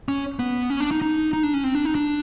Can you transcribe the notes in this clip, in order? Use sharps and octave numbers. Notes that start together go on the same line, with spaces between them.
C#4
B3
C#4
D4
D#4
D#4
D#4
D4
C#4
C4
D4
D#4
D4